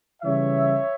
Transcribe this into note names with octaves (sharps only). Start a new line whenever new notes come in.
C#3 E3 G3 C#5 E5